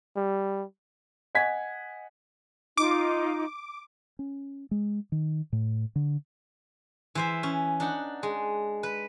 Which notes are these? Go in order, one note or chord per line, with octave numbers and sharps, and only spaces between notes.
G3
D#5 F#5 G#5 G#6 B6
D#4 F4 D6
C#4
G#3
D#3
A2
D3
E3 C5 E5
C#4
D4 D#4 F#5
G#3
B4